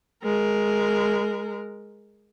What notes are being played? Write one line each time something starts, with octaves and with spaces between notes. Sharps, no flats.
G#3 A#4